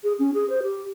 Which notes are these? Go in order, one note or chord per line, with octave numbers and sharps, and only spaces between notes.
G#4
C#4
G#4
C5
G4